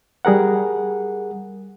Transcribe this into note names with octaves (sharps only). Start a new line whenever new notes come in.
G3 G#4 A#4 F#5